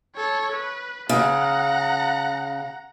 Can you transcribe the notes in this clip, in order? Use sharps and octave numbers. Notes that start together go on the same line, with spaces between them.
A4 C#5
B4
C#3 F#5 A#5